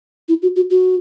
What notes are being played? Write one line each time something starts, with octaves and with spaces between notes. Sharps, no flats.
E4
F#4
F#4
F#4